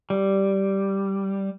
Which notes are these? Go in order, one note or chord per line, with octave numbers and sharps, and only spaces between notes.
G3